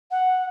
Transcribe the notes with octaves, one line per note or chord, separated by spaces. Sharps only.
F#5